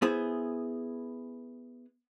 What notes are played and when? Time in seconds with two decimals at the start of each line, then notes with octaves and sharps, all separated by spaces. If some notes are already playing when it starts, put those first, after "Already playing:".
0.02 B3 E4 G#4 C5